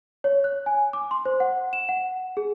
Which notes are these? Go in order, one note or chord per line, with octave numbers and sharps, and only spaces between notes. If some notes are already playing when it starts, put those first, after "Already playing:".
C#5
F#6
G#5
D6
C6
C5
F#5
E7
F#5
G#4